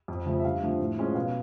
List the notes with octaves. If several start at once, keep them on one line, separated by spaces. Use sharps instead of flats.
F2
C#3 F3 A3
E5
G2 F5
D3 F3 A3 C4
A2
F3 G#3 C#4
B2 F5